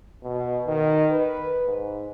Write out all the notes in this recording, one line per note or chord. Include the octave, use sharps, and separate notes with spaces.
B2
D#3
B4
G#2